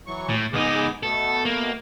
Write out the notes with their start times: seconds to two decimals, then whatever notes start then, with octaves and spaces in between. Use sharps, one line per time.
0.07 E3 F#3 C#6
0.29 A2
0.53 C#2 B3 D#4 G#4 D6
1.03 B2 A3 B3 A4
1.45 A#3